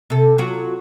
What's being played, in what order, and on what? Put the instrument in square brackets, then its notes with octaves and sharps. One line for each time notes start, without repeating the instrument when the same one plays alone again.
[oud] C3 A4
F#3 F4 F#4